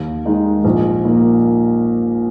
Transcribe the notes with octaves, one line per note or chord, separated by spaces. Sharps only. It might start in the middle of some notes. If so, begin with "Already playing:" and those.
Already playing: D#2
D#3 G#3 D#4
A#1
A#2 A#3 D#4